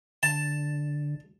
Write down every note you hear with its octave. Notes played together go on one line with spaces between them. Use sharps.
D3 A5